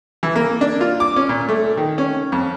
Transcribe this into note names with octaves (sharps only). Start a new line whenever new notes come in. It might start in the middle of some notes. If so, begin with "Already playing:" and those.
E3
A#3
D4
F4
D6
C#4
A#2
A3
D#3
C#4
F2